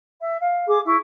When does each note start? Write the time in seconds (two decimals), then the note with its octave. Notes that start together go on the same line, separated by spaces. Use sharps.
0.19 E5
0.40 F5
0.67 G#4 D6
0.85 E4 C#6